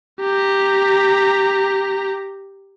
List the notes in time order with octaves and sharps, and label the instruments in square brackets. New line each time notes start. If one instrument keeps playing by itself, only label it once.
[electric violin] G4 A#5